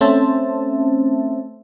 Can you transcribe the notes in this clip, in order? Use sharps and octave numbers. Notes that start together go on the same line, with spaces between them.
A3 C4 C#4 C5 E5 A5